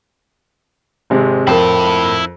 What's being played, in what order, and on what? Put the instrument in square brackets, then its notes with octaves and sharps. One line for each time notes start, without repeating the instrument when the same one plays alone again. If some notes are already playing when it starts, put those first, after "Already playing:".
[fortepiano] G#1 C3 G#3
[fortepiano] F2 [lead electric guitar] E4 A5 [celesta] A#4 G5